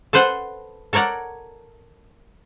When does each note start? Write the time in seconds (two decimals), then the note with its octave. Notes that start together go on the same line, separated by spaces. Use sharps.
0.13 A4 B4 C5 F#5
0.93 A4 A#4 C#5 D5 F#5